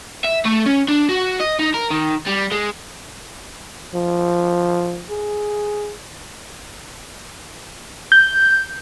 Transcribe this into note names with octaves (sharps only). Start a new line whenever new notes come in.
E5
A3
C#4
D4
F#4
D#5
D#4
A#4
D#3
G3
G#3
F3
G#4
G6